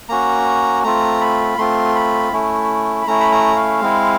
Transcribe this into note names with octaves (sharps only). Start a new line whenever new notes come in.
A#3 C#4 F#4 A#5
A3 C4 F4 A#5
B5
A3 C4 F4 C6
B5
A3 C#4 E4
B5
A3 C#4 E4 A#5
B5
A#5
F5
G#3 C4 E4